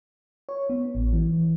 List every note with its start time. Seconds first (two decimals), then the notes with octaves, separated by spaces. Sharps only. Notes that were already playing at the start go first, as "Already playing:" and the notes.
0.49 C#5
0.70 B3
0.95 A1
1.13 E3